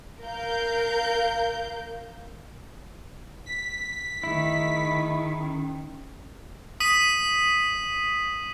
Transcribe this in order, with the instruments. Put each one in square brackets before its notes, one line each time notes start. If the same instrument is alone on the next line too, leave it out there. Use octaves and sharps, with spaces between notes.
[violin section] A#4 F5 G6
[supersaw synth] B6
[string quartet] D#3 [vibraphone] A3 G#4 D#5 [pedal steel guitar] E4
[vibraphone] C#4 D#4 G5
[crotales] D#6 B6 D#7